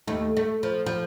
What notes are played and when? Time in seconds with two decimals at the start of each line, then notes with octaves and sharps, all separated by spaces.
0.07 D#2 A3
0.37 A3
0.63 F3
0.86 F3